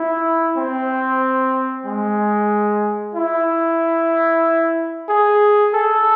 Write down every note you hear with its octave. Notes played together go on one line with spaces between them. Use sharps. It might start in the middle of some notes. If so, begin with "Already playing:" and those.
Already playing: E4
C4
G#3
E4
G#4
A4